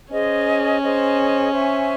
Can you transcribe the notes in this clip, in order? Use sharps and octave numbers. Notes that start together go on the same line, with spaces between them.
C#4 G#4 C5 D#5
G#4 C5 D#5
C5 E5 G#5 C#6